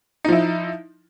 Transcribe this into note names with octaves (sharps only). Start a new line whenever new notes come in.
F3 D#4 E4